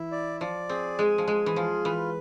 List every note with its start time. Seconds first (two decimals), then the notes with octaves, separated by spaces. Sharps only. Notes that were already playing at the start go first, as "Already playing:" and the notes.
Already playing: E3 E4
0.12 D5
0.41 F3 D5
0.69 C4 G#4
0.99 G#3 G#5
1.18 F3
1.28 G#3 G#4
1.46 E3
1.56 F3 F4
1.85 E3 B4